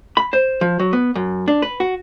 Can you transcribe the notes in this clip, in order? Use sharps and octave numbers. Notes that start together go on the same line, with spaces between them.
B5
C5
F3
F#3
B3
F#2
D4
B4
F#4